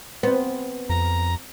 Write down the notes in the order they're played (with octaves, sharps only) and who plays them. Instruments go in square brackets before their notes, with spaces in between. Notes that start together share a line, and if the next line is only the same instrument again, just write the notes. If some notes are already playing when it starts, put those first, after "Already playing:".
[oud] B3 [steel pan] C4 C5
[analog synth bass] F2 [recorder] A#5